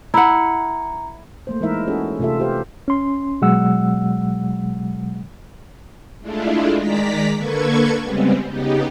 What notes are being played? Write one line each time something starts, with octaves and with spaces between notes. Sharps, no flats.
E4 F#5 A#5
A3 A#3 C5
E3 G#3 D#4 E4 A#4 E5
C#4 F#4 G#4 A4 C#5
C3 A3 F4 A4 E5
F4 G4 B4 C5 F5
C#4 C6
B2 F#3 G#3 F#5 E6
G#3 A3 D4 E4 F4
D#3 G#3 D5 A#5 B6
D3 A#3 A4 B4 C#6 G#6
C#3 G3 G#3 B3 C4
C#3 B3 D#4 G4